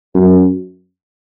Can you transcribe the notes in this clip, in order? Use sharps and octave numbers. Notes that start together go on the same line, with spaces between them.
F#2